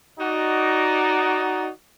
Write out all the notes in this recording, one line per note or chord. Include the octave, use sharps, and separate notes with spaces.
D#4 F#4 D5